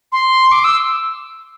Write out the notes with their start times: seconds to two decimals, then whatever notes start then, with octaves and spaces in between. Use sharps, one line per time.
0.12 C6
0.52 D6
0.64 E6